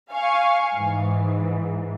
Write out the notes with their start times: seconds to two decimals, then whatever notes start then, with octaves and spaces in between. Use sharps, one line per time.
0.12 F5 G#5 C#6
0.76 G#2 E3